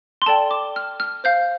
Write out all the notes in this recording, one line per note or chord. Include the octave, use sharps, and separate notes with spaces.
C6
A4 D5 G5 A5
D6
F6
F6
C5 F5 G6